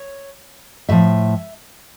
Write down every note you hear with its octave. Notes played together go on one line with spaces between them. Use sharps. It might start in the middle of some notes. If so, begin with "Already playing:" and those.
Already playing: C#5
A2 F3 E5